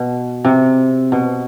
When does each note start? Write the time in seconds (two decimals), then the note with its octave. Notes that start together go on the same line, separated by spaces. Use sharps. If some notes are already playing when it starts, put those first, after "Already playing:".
Already playing: B2
0.45 C3
1.12 B2